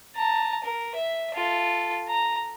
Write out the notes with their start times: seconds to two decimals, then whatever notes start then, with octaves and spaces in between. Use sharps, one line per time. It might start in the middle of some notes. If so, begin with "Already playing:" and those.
0.16 A5 A#5
0.64 A#4
0.95 E5
1.35 F4 A4
2.08 A#5